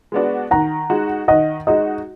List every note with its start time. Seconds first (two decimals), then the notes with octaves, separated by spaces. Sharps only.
0.12 G#3 B3 D4 F#4
0.51 D#3 F#5 A#5
0.90 G#3 D#4 F#4
1.28 D#3 D#5 F#5
1.67 G#3 D#4 F#4 D#5